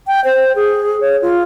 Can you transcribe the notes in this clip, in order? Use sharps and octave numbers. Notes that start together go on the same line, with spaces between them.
G5
C5
G#4
C#5
F4